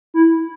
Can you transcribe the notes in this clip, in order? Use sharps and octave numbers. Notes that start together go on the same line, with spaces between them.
E4